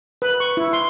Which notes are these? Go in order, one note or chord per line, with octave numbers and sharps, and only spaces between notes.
B4
C#6
E4
C6